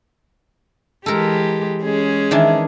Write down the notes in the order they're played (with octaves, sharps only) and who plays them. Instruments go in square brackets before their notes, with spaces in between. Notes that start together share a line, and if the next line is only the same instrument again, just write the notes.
[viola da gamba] E3 G#3 G4 [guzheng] A4 A#4
[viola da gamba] G#3 C#4 G#4
[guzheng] D#3 E3 D4